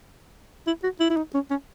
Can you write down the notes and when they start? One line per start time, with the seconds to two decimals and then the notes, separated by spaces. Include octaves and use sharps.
0.67 E4
0.83 F#4
1.00 E4
1.10 E4
1.17 D#4
1.34 C#4
1.50 C#4